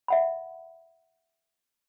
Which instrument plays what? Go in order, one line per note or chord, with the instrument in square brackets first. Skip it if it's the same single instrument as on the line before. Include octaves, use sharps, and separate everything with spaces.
[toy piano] E5 F#5 B5